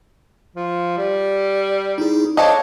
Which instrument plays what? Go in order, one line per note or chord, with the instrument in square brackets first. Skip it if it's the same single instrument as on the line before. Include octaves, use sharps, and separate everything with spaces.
[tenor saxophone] F3
G3
[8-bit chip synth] D#4 E4 G#4
[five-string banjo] D4 A4 D#5 [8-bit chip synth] C5 F5 [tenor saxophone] C#5